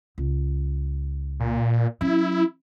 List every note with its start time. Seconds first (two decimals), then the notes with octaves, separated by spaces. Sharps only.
0.18 C#2
1.40 A#2
2.01 F#3 C#4 E4